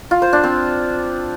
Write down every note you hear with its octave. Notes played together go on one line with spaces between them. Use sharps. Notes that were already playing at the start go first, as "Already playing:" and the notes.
F4
C5
D4
C4